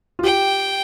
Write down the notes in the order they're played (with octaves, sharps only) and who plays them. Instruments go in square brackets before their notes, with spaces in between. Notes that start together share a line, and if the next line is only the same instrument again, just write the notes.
[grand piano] F4
[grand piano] G4 [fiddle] G5